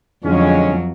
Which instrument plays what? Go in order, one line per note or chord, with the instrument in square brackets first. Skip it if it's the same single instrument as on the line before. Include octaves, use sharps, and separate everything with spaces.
[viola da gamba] F2 F#3 [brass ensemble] D3 G#3 C#4